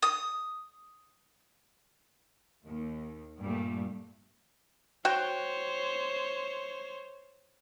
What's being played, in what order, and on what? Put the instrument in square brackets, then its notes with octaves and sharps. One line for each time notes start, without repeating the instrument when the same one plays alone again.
[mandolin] D#6
[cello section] D#2
G2 A#2 G3 A3
[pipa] F#4 G5 [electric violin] C5 C#5